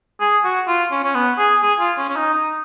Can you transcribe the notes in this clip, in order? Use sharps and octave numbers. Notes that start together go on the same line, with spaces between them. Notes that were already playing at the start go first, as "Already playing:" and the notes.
G#4
F#4
F4
C#4
C#4
B3
G#4
G#4
F4
C#4
C#4
D#4
D#4